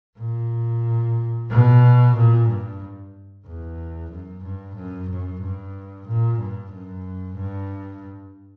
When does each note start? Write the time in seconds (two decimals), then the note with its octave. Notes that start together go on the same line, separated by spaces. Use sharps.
0.19 A#2
1.50 B2
2.15 A#2
2.48 G2
3.46 E2
4.10 F#2
4.43 G2
4.76 F#2
5.09 F#2
5.42 G2
6.07 A#2
6.39 G2
6.72 F#2
7.37 G2